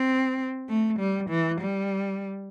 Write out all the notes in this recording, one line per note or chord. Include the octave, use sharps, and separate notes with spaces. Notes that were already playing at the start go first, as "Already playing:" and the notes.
Already playing: C4
A3
G3
E3
G3